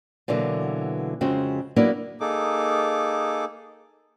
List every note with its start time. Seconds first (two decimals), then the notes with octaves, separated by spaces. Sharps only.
0.28 B2 D3 E3 F#3 A#3
1.21 F2 C#3 G#3 C4 F#4
1.76 F#3 A#3 B3 D4 E4 F#4
2.20 A#3 D#4 G#4 A4 D6